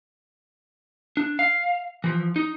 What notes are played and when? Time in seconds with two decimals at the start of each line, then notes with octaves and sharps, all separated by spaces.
1.17 D4
1.39 F5
2.04 E3 F3
2.36 D#4